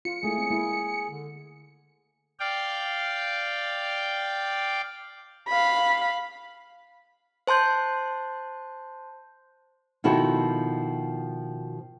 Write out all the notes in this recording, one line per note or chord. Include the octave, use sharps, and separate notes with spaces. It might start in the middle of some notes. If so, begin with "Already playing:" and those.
F4 C#7
G#3 A3 E4 G#4
C4
G#3 A#3 E4
D3
D5 F5 G5
F5 B5
C5 A5 C6 G6
B2 D#3 F3 E4 F#4 A4